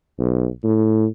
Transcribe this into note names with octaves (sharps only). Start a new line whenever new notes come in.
B1
A2